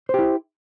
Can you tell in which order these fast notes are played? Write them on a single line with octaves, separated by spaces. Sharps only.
C5 G4 E4